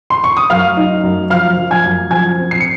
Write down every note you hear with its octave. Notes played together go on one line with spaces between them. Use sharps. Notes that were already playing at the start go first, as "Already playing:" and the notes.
C6
C#6
D#6
F#2 F5 F6
D#4
F#2
F3 F5 F6
F3
G#5 G#6
F#2
F3 G#5 G#6
C4
C7
C#7